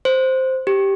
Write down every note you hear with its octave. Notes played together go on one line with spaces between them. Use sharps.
C5
G4